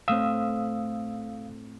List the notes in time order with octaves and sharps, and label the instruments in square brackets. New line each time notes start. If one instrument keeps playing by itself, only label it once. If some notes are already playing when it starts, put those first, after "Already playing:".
[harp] A2 A3 C4 [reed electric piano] F5 D#6 E6